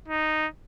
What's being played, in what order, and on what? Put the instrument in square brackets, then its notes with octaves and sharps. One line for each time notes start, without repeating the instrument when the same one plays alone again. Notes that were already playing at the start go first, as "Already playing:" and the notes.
[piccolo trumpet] D#4